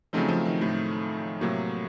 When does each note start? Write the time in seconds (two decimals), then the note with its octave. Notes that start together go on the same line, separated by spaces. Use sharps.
0.13 C#3 F3 F#3 A3 C4 D#4
0.29 F3
0.45 D#3
0.61 A2
1.41 A2 C3 F#3 A#3